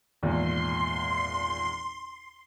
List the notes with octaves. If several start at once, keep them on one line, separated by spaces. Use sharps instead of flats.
G#1 E2 A#2 C6